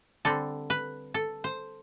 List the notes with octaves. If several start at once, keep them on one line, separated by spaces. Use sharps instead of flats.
D3 G3 C4 A4
B4
A4
C5